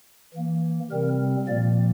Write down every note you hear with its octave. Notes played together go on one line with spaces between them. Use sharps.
E3 A#3
C3 G3 C4 A#4
A#2 F3 A#3 D5